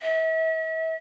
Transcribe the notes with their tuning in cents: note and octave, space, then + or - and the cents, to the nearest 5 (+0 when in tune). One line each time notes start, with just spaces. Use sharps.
E5 -40